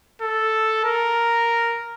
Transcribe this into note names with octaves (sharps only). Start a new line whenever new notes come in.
A4
A#4